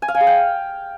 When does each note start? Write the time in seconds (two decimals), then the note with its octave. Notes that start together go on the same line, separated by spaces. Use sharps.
0.02 G#5
0.08 F5
0.15 G#5
0.21 G#4
0.27 G5